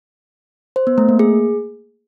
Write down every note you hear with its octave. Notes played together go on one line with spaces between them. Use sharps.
C5
B3
A3
A#3
G#4